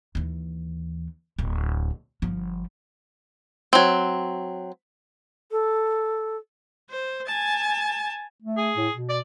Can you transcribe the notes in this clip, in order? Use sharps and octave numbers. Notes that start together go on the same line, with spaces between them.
D#2 E3
D1 A#3
G1 F3
F#3 C4
A4
C5
G#5 A5
A3
G#4
A2
B2
D5